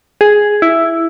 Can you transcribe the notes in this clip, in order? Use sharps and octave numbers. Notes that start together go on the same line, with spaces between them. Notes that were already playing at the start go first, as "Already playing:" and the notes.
G#4
E4